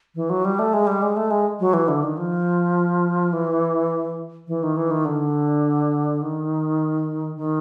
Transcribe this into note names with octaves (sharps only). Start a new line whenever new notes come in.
E3
F#3
G3
A3
G#3
G3
G#3
A3
G#3
F#3
E3
D3
D#3
F3
E3
E3
D#3
E3
D#3
D3
D#3
D#3